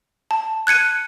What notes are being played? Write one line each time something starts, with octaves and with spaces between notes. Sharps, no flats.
A5
F#6 G#6 C#7 D#7